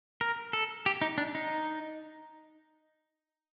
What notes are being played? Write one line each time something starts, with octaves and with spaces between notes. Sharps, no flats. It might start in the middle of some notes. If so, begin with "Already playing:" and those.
A#4
A4
G4
D#4
D4
D#4